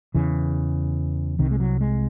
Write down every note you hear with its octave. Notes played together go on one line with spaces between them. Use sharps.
E2 C#3 E3
C2 C3 D#3
G#3
F#3
G#3